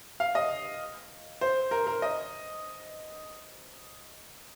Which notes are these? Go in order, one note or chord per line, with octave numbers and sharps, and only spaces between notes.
F5
D#5
C5
A#4
A#4
D#5